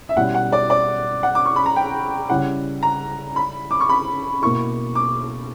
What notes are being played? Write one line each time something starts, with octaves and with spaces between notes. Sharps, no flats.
E5
B2 G3 C#4 E4 F#5
F#5
D5
D5
F#5
D6
C#6
B5
A#5
G5
C#3 G3 C#4 E4 F#5
A#5
B5
D6
C#6
B5
B2 A#3 E4 C#6
D6